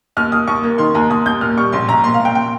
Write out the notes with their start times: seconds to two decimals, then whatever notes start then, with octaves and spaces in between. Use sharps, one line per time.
0.17 D#2 F6
0.32 D#2 D#6
0.48 D#2 C#6
0.63 A#3
0.78 D#3 C6
0.95 D#2 A#5
1.10 D#2 D#6
1.26 D#2 G6
1.41 A#2 F6
1.57 G3 C#6
1.72 A#1 C6
1.88 A#1 A#5
2.04 A#2 C6
2.14 F5
2.20 A#2
2.25 G5
2.35 G5